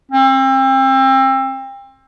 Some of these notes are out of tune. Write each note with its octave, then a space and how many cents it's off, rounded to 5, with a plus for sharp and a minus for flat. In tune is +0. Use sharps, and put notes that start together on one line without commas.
C4 +30